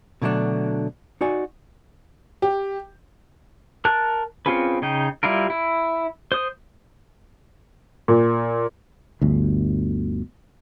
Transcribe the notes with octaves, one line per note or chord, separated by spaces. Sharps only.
B2 D3 F#3 A3 D4
D#4 F#4 D5 G#5
G4
A#4 A5 F#6
C4 C#4 F4 G#4 B4
C#3 D#4 G5
G3 E4 F4 A#4
E4
C5 D#6
A#2
G1 D2